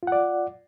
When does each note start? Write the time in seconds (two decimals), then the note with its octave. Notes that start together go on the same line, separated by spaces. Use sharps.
0.03 F4
0.07 F#5
0.12 D5